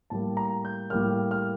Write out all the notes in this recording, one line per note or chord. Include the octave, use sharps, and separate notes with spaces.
A2 G3 A#3 A5
A#5
G6
A2 G3 A#3 F6
F6